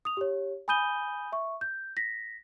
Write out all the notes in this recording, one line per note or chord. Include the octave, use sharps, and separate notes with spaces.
D#6 F7
G4 C#5
G#5 B5 D#6 G6 D#7 G7
E5 C#6
G6
A#6 B6